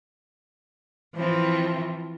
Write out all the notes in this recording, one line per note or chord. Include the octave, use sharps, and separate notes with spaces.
E3 F3 C4